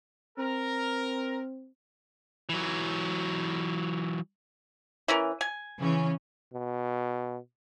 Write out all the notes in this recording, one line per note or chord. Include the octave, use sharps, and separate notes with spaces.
C4 A#4
E3 F#3
E3 C#4 A#4
G#5
C#3 E3 C#4
B2